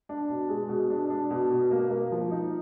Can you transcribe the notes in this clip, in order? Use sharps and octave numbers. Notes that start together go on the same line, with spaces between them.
D4
B2
G#3
B2
D4
D4
B2
B2
A#3
A#3
F3
D#4